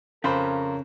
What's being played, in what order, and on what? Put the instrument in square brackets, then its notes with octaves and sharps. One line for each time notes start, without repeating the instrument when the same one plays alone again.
[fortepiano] F2 C5 B5 [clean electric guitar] C#3 [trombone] A#4